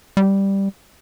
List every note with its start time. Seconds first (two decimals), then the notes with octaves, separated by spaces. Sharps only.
0.17 G3